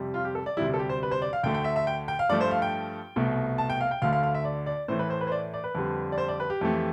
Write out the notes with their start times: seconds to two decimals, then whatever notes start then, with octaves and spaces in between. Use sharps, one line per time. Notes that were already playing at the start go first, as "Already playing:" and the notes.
Already playing: F2 C3 G3
0.14 F4
0.25 G4
0.35 A4
0.46 D5
0.57 D2 C3 G3 E4
0.74 A4
0.79 G4
0.89 C5
1.03 B4
1.11 C5
1.22 D5
1.33 F5
1.43 D2 D3 A3 G5
1.54 G5
1.64 E5
1.76 E5
1.87 G5
2.08 G5
2.19 F5
2.29 G2 F3 A3 D5
2.41 C5
2.51 F5
2.62 G5
3.16 C2 B2 A3
3.58 A5
3.70 G5
3.81 F5
3.91 G5
4.02 D2 D3 A3 F5
4.13 F5
4.23 F5
4.34 E5
4.45 D5
4.66 D5
4.88 A2 E3 A3 C5
4.99 B4
5.10 C5
5.21 B4
5.27 C5
5.32 D5
5.54 D5
5.64 B4
5.75 F2 D3 G3
6.12 D5
6.18 C5
6.28 D5
6.40 B4
6.50 G4
6.61 F2 E3 A3